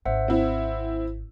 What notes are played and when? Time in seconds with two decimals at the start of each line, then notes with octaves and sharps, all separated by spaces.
0.06 G#1 C5 E5 F#5
0.28 C4 E4